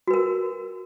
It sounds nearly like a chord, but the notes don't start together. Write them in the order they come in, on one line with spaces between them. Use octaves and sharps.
F#4 B4 A#4